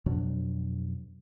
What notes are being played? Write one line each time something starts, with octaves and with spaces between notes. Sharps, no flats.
F2 B2 F#3 D4